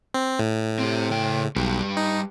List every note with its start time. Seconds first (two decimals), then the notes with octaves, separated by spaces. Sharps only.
0.14 C4
0.39 A2
0.79 C4 G4
1.11 C#3 G5
1.56 B1 G3 G4 B4
1.97 D#4